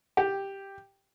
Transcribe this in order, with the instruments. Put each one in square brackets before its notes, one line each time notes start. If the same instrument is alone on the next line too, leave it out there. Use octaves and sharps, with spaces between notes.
[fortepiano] G4